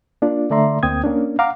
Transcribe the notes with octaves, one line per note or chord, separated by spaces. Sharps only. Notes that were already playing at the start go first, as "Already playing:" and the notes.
A#3 D4 F4 D5
D3 A3 D5 E5 A#5 C6
D2 A#3 C4 G5 D#6 G#6
A#3 C#4 D4
F5 F#5 A#5 D6